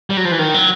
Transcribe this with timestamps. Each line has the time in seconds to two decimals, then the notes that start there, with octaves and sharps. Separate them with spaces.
0.10 G3
0.17 F#3
0.25 F3
0.32 E3
0.39 D#3
0.54 F#3